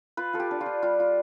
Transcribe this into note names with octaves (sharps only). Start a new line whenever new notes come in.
F4 B4
F4 A4
G4
D4
F4
D4
G3 F4
F4